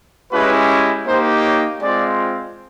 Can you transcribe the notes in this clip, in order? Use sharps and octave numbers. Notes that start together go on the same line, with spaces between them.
G#3 C#4 E4 G4 B4
A#3 D#4 G4 C5
C#5
G#3 C4 F4 D5